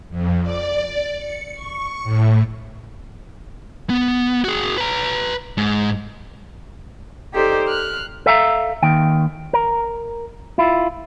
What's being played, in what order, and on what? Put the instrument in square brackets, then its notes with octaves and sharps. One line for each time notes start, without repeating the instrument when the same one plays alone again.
[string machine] F2
D5
C#7
C#6
A2
[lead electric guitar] B3
F#4 G#4
B4 A#5
G#2
[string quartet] D#4 G4 A4 C5 D5
F6 F#6
[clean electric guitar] A4 E5 F5 G#5 A#5
D#2 D#3 G5
A#4
E4 F4